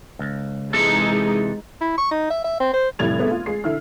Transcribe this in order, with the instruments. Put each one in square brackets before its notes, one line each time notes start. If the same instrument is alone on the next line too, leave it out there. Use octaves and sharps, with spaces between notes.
[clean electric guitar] C#2
[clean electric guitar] C3 E3 A4 [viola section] G#3 D#4
[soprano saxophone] E4
C#6
D#4
E5
E5
C4
C5
[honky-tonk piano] F1 A2 G3 G#6 A6 F7
G#3 A3 B3
F4
G#3 C7
D3 E4 F6